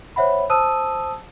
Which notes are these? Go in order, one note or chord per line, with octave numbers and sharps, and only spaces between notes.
C5 C#5 E5 F#5 B5
C5 A5 D#6 E6 D#7